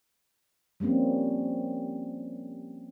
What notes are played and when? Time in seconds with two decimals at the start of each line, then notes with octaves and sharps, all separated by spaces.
0.80 F3 G3 A#3 C4 C#4